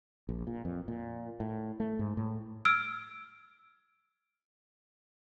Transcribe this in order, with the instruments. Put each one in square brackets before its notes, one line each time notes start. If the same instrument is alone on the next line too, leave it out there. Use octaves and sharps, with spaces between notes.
[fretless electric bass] A#1
A#2
F2
A#2
A2
A3
G#2
A2
[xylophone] E6 F6 G#6 D7